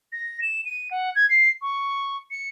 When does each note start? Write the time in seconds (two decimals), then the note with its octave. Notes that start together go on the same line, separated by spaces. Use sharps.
0.13 A#6
0.42 E7
0.65 D#7
0.91 F#5
1.16 G#6
1.29 C7
1.62 C#6
2.31 C#7